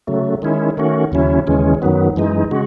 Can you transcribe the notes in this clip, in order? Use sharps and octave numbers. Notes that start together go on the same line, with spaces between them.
C#3 F#3 A3
D#3 G#3 C#4 E4
D#3 A3 C#4 F#4
D#2 C#3 F#3 C#4 E4
D#2 C#3 E3 G#3 C#4
F#2 D#3 F#3 B3
F#2 E3 G#3 D#4
C#3 G#3 F#4